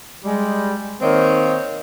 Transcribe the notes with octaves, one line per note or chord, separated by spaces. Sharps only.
G3 G#3
D#3 A#3 C4 C#5 D#5